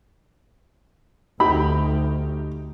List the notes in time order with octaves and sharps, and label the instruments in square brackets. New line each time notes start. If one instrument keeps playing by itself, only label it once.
[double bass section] D2 [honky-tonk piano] D#4 G4 [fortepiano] B5